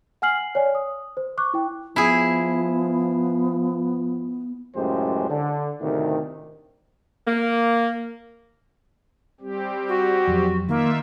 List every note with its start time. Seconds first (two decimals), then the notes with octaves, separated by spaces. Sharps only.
0.22 F#5 G#5 F6 C7 F#7
0.55 C#5 D5 G#5
0.75 D#6
1.17 C5
1.38 C#6 D6 F#6
1.54 E4 G5
1.96 F3 B3 E4 G#4
4.76 C#2 F#2 A2 G#3 G4 C5
5.29 D3
5.81 D2 A2 C3 D#3
7.26 A#3
9.41 G3 C4 G4
9.88 F#4
10.27 F2 F#3
10.68 D#3 A#3 D#4 F4 E5